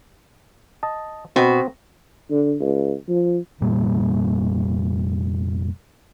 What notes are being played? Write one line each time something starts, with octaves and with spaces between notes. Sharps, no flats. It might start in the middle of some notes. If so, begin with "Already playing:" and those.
D#5 A5
B2 C4 F#4
D3
C#2
F3
F1 A#2 G3 A#3